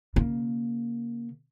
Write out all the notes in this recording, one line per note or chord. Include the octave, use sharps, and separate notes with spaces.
C#3 A#3